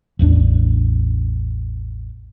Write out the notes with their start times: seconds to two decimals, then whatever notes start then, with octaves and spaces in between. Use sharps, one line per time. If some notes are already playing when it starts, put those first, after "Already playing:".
0.19 A1 E2 A3 D4